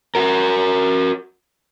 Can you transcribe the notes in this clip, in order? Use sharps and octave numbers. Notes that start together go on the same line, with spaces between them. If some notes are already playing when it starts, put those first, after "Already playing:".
F#4 A#4